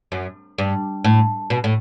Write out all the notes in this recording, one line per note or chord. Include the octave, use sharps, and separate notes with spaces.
F#2
G2
A2
B2
A2